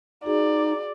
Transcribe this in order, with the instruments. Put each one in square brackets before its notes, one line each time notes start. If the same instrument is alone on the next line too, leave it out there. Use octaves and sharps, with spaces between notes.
[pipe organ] D#4 [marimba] F#4 G#4 [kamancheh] D5